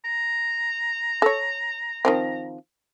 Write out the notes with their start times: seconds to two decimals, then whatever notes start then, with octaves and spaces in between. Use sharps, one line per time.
0.05 A#5
1.22 A4 C#5
2.05 D#3 F3 C4